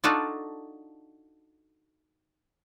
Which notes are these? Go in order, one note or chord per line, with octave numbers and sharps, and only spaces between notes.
D4 D#4 F4 F#4 A4 D5